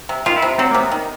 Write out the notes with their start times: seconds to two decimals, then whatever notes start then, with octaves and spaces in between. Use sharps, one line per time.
0.09 C3
0.26 D#3 F4
0.36 E4
0.42 C3
0.58 F#3 C4
0.71 C3 A#3
0.80 B3
0.92 D#3